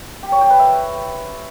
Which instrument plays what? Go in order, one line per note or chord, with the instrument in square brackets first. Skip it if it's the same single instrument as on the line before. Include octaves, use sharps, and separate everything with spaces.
[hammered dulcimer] G4
C#5
G5
B4
E5